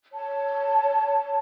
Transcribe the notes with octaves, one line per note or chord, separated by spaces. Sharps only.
C#5 A5